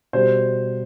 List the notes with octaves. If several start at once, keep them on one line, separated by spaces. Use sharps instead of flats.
B2 G3 C5